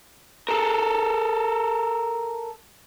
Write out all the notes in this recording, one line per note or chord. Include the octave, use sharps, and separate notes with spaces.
A4 A#4